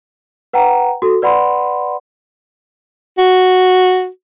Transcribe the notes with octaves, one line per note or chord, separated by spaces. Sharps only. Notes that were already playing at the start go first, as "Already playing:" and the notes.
B4 F#5 G5 A#5
F#4 A4
B4 D5 F#5 B5 C6
F#4